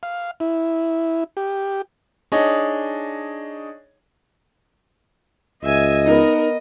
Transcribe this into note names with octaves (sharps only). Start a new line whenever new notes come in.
F5
E4
G4
D4 D#4 G#4 C#5 D#5
C#2 D#5 E5 G#5
B3 D#4 A#4